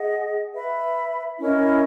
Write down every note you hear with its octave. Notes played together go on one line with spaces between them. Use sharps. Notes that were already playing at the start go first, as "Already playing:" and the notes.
Already playing: G#4 D#5 F#5
B4 E5 B5
C#4 E4 A#4 D#5